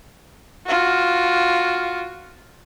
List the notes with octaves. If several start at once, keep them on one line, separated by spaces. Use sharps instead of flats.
F4 F#4